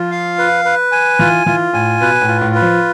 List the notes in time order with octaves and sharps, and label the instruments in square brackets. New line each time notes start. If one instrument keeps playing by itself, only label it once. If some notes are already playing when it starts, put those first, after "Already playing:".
Already playing: [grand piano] F3 [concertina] F4
[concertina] F5
B4
B4
G#5
[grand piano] E3 [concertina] F4
[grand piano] E3 [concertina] F4
[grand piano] A2 [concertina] G#5
[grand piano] B2 [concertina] B4
[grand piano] A2
[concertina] F4
[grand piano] A2
[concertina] B4
[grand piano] F3